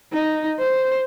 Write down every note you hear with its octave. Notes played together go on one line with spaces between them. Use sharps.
D#4
C5